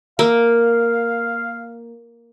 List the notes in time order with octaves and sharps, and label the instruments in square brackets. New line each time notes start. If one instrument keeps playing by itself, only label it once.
[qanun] A#3 [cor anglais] F5